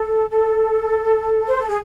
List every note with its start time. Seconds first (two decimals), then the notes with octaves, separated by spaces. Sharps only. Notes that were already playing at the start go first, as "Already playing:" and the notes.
Already playing: A4
0.30 A4
1.48 C5
1.57 A4
1.67 G#4